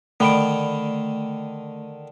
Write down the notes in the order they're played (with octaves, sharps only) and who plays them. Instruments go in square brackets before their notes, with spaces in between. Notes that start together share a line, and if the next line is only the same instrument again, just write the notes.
[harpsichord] D3 D#3 [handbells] A3 B5 D7